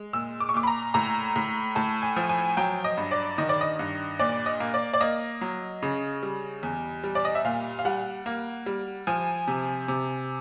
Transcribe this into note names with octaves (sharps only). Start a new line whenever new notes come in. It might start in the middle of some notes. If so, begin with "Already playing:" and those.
Already playing: G#3
A#2 E6
D6
C#6
A#2 D6
B5
A#5
A2 A#5
A2
A2 A5
G#5
F3
G#5
F#3 G5
D#5
G2
D5
D#3 D#5
D5
D#5
G2
A#2 D5
D#5
A#3
D5
D5
A#3 D#5
F#3
C#3
G3
E2
G3
D5
D#5
E5
A#2 F5
F5
G3 F#5
A#3
G3
F3 G#5
C3
C3